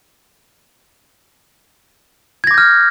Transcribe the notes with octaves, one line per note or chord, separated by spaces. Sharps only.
D6 F6 G6 G#6 A#6